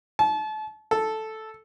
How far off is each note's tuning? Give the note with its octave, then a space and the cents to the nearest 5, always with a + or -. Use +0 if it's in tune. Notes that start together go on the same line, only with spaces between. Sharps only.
A5 -35
A4 -5